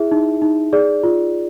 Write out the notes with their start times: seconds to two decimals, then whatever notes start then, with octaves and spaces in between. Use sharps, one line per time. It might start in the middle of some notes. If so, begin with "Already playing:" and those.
Already playing: E4 G#4 E5
0.12 D#4
0.42 D#4
0.73 G#4 D5
1.03 F4